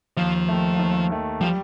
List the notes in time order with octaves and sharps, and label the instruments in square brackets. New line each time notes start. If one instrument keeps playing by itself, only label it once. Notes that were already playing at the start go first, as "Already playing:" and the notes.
[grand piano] D#2 [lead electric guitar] F3
[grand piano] D#3 A3
D#2
D#3 A3
[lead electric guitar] F3 [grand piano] G3